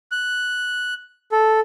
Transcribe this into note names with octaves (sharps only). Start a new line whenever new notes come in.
F#6
A4